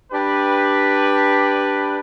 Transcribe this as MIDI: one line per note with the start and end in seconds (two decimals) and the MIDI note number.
0.12 1.98 62
0.12 1.98 67
0.12 1.98 71